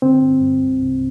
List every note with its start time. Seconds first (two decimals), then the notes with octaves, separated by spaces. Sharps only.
0.02 D3 C4
0.22 G2
0.41 G2
0.62 C2
0.82 C2